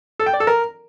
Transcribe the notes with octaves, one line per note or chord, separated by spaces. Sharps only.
A4
G5
D5
A4
A#4